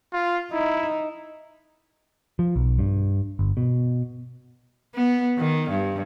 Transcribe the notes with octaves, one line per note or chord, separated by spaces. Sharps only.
F4
D#4 E4
F3
B1
G2
G1
B2
B3
D#3
G2